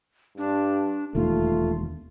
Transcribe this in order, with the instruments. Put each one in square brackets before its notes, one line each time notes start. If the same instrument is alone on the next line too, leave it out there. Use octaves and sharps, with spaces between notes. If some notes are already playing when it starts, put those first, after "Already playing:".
[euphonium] G2 [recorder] D4
[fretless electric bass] E1 D#2 [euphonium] A3 [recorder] F4